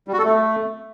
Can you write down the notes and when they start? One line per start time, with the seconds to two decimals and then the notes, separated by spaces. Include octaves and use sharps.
0.08 G3
0.13 F#4
0.19 A4
0.24 A3